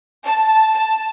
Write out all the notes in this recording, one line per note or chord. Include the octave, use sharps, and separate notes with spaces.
A5
A5